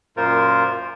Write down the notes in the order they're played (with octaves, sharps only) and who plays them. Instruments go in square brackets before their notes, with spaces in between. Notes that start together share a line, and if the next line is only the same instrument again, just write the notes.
[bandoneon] F#2 A#2 F4 A#4 C5